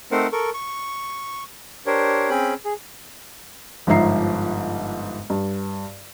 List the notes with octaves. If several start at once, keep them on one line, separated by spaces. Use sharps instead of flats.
A3 C4 D#4 A#4 C5 F#5
A4 A#4 C#6
C#6
D4 G4 A#4 C5 C#5
C4 C#4 G#4 G5 B5
G#4
G1 G#2 F3 E5 A#5 C7
G2